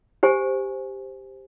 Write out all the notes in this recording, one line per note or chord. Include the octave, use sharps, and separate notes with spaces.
G4 C5 G#5